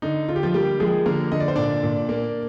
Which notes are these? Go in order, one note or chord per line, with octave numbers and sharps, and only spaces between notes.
D3 D#4
D3 F4
G4
F3 F4
G3 A#3 G4
F3 G#3 G#4
D3 A#3 A#4
D3 D#5
D5
C5
A#2 D4 D5
A#2
A#3